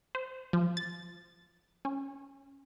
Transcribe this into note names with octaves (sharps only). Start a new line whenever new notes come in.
C5
F3
A6
C#4